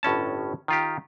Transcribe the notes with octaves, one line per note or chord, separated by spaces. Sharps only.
G1 A2 C#4 A5
D#3 F4 G4